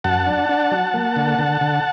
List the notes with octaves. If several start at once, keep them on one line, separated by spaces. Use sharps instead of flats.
F#2 F#5 A5
D4
D4
F#3
A#3
D3
D3
D3